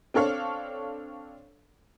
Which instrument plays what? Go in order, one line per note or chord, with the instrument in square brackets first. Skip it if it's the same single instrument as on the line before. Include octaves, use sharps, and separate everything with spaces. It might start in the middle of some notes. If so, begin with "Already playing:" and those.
[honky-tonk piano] C4 D4 A4 C#5 F5